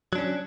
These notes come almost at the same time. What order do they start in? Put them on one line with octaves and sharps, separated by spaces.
F#3 D4 C#4